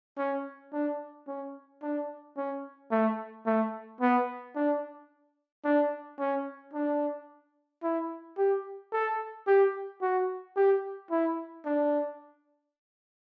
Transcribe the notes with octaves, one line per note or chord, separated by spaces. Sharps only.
C#4
D4
C#4
D4
C#4
A3
A3
B3
D4
D4
C#4
D4
E4
G4
A4
G4
F#4
G4
E4
D4